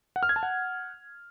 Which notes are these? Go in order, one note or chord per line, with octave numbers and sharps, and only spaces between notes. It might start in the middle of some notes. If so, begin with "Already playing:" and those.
F#5
F6
G#6
A5
F#5